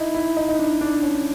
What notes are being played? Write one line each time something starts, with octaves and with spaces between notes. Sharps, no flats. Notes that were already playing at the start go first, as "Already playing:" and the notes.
Already playing: D#4 E4
E4
D#4
D#4
D4
D4
C#4